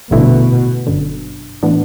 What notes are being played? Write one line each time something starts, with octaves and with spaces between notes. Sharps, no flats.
A1 G2 B2 D3 A3 E4
G1 F#2 D3
A2 E3 B3 D4